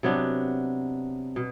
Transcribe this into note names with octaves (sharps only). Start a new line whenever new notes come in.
C3 F#3 B3 D4
B2